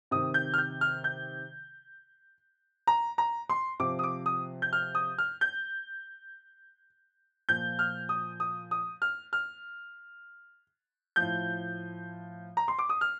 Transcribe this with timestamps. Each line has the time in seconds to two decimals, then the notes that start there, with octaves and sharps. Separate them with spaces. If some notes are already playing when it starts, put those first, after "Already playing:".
0.11 C3 D#3 D#6
0.34 G6
0.54 F6
0.58 G6
0.81 F6
1.04 G6
2.87 A#5
3.18 A#5
3.50 C6
3.80 C3 F3 D6
3.99 D#6
4.03 D6
4.26 D#6
4.62 G6
4.73 F6
4.95 D#6
5.18 F6
5.41 G6
7.49 A#2 F3 G6
7.79 F6
8.09 D#6
8.40 D#6
8.71 D#6
9.02 F6
9.33 F6
11.16 A2 F3 G6
12.57 A#5
12.68 C6
12.79 D6
12.90 D#6
13.01 F6